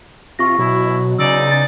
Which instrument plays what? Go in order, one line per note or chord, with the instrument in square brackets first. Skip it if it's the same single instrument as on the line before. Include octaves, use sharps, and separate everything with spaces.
[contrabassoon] C3 [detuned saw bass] F4 [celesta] C#6 A#6
[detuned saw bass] B2 [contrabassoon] F#3 [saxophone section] E4
[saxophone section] E2 D#4 D5 [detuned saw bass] C#3 [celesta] E6
[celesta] A6